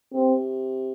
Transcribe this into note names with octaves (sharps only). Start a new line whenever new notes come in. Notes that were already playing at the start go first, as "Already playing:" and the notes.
C3 C4